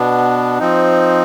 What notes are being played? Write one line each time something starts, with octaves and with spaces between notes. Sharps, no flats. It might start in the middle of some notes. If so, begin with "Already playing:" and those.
Already playing: B2 B3 D4
F3 C4 D#4